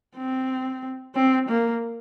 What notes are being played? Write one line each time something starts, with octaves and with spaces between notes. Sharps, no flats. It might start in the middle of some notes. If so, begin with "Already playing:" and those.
C4
C4
A#3